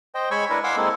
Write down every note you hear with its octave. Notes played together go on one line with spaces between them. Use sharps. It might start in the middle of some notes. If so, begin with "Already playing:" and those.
C5 D#5 G5
G#3 C#5 G#5 B5 C#6 E6
D4 E4 A#4 B4
F5 F#5 G#5 C6 D6 E6
G#3 A#3 C4 E4 A4